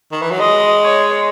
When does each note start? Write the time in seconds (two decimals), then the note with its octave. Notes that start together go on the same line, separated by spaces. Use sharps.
0.12 D#3
0.22 E3
0.31 F#3
0.40 G#3 D#5
0.83 C#5